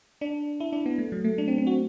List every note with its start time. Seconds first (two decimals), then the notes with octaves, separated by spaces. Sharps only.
0.21 D4
0.60 E4
0.72 D4
0.86 B3
0.98 A3
1.12 F#3
1.24 A3
1.38 D4
1.48 C4
1.58 C4
1.67 F#4